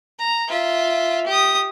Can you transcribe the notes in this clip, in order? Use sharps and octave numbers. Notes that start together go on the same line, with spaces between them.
A#5
F4 E5
G4 D#6